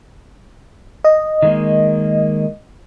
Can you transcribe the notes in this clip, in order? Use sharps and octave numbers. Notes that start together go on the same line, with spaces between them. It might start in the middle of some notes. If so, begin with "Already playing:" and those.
D#5
D#3 G#3 A#3